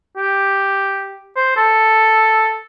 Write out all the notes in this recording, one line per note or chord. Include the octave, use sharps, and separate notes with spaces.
G4
C5
A4